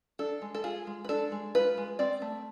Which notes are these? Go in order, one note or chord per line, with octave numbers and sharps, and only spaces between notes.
D4 A4
G#3
A4
F4 G#4
G#3
B4
D4 A4
G#3
F4 B4
G#3
C4 D5
A3